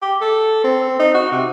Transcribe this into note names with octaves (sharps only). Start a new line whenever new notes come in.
G4
A4
C4
D#4
F#4
C3